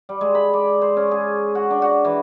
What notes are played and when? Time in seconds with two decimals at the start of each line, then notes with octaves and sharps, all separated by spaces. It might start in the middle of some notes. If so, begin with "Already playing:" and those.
0.09 G3
0.21 G#3
0.35 B5
0.54 D5
0.81 C5
0.97 C#4
1.11 G#4
1.55 F#4
1.70 D4
1.82 F#4
2.05 E3